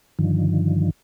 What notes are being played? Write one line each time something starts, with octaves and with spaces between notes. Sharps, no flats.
G2 D3 D#3 F3